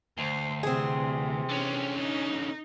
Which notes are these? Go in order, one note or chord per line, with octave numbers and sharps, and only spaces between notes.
D2 C5
C3 E3 C4 G#4
D3 C#4
D#4